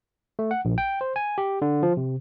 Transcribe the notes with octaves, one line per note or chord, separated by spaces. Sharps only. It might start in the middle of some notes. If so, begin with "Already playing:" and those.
A3
F#5
A#1
G5
C5
G#5
G4
D3
F3
C3